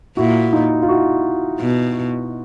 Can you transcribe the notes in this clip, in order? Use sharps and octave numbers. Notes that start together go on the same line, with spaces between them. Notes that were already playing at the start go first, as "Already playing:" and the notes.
A#2 E4 F#4
D#4 F4
F4
E4 F#4
B2